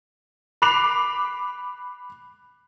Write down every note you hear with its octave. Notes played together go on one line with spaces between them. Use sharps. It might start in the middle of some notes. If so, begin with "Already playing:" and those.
B5 D6 F#6 C7 F7